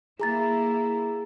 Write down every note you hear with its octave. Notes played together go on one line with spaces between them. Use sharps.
A#3 E4 G#4 A#5 A6